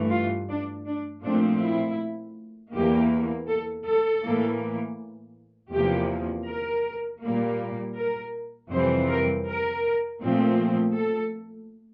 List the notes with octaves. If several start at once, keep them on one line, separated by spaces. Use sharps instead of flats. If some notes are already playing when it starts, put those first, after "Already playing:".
Already playing: G2 E3 A3
F4
D4
D4
A#2 F3 A3 C4 D4
E4
E2 E3 A#3 G4
A4
A4
A2 E3 A#3
E2 C3 F3 A#3 G4
A#4
A#2 G3 A#3
A#4
F2 C3 E3 G3 C4 C5
A#4
A#4
A#2 F3 A3 C4
A4